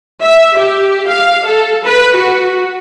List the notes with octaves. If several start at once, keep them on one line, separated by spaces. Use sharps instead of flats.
E5
G4
F5
A4
B4
F#4